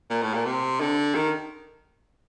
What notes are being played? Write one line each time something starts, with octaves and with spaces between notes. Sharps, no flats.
A#2
A2
A#2
C3
D3
D#3